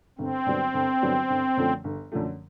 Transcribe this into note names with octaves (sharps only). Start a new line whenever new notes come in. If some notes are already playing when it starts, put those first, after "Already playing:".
G1 C4
G2 D3 F#3 B3
G1
G2 D3 F#3 B3
G1
F#2 D3 F3 A3
G1
F#2 D3 F3 A3